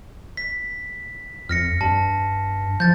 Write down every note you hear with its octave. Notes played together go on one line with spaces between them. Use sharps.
B6
F2 F6 A#6 C#7
G2 A5
F3 G6 A6